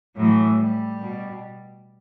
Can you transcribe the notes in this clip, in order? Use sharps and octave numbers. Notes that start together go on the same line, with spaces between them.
A2 E3 F#3
G3
B2